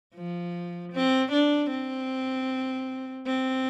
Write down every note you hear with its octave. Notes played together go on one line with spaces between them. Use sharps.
F3
C4
D4
C4
C4